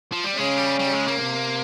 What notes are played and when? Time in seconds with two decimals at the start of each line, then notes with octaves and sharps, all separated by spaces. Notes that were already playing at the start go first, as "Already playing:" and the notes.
0.12 F3
0.24 G3
0.37 C#3 G#3
0.58 G3
0.80 G3
0.93 G#3
1.08 A#3
1.22 C3